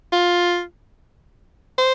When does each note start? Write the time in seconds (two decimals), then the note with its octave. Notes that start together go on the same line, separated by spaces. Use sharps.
0.12 F4
1.78 C5